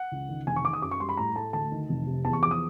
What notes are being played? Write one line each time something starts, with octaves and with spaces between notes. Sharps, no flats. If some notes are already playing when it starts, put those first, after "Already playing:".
Already playing: F#5
C#2
D#3
F1 G#5
C#6
D#3 D6
D#6
F#2 D6
C#6
G3 C6
B5
A2 A#5
A3 A5
D2 A5
D#3
F1
C3
E2 A5
C#6
F3 D6
D#6